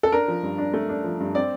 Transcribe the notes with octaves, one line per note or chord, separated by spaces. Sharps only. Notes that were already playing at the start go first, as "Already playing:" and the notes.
A4
D4 A#4
F3
G2
D4
A3
D4
F3
G2
C4 D5